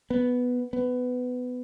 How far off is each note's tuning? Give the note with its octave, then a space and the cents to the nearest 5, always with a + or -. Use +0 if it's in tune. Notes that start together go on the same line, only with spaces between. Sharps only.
B3 +0
B3 +15